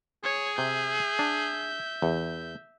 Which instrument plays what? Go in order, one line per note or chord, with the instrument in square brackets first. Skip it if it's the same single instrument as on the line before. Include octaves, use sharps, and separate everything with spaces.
[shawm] G#4 [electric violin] C#5
[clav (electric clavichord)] C3 [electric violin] E5 G6
[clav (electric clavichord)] D4
E2